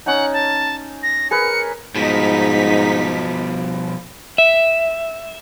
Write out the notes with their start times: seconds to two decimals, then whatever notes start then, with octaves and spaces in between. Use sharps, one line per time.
0.06 C#4 D#4 F#5
0.33 A5
1.03 A#6
1.31 G#4 A#4 B4 C#7
1.96 G#2 B2 F3 D#4 B6
4.38 E5